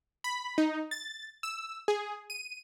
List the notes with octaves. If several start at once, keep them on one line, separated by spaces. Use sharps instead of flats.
B5
D#4
A6
E6
G#4
D#7